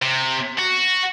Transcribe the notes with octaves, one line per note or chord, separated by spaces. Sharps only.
C3
F#4